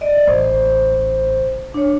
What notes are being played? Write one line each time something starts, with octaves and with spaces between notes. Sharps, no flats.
D5 D#5
A1 C5
D4 C#5